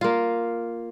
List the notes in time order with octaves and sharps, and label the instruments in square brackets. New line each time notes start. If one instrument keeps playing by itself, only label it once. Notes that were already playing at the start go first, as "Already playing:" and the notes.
[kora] A#3 F4